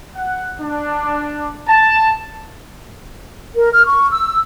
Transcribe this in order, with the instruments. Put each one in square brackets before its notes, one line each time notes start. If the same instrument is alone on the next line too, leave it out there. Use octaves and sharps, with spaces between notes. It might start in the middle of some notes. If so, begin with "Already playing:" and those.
[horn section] F#5
D4
A5
[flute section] A#4
F6
C#6
E6